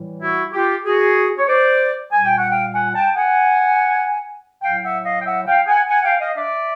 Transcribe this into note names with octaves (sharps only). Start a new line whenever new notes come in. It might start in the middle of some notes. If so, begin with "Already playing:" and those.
Already playing: A2 E3 G3
E4 F#4
F4 G4
F#4 G#4
C#5
C5 D5
A#2 G3 G#5
G5
F#5
F5 G5
F#5 G#5
G5 A5
F#5 G#5
A2 F#3 F5 G5
E5 F#5
D#5 F5
G5
E5 F#5
F5 G5
F#5 G#5
F#5 G#5
F5 G5
D#5 F5
D5 E5